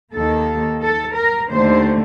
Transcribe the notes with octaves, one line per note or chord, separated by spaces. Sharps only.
D#2 D#3 A#3 A4
A4
A#4
D#2 D3 A3 C5